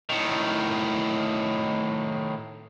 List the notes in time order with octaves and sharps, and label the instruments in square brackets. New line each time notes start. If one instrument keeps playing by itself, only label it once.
[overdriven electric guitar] A2 D#3